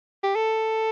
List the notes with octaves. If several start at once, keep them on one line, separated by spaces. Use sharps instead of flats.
G4
A4